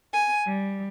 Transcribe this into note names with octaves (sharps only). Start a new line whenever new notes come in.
G#5
G3